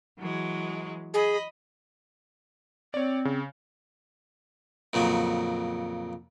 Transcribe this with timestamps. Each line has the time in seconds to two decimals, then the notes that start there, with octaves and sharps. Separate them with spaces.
0.17 E3 F#3 G#3
1.14 G#4 D#5 B5
2.94 C4 C#5 D5
3.25 C#3
4.93 F2 A#2 C#3 F#3